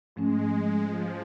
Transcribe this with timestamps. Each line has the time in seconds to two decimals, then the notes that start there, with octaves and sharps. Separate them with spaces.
0.16 G#2 F3 G#3 A3 C#4
0.82 F3